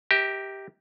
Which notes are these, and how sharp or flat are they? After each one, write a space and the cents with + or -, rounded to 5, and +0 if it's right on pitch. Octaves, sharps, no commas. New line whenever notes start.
G4 +0 A#4 +0 E5 -45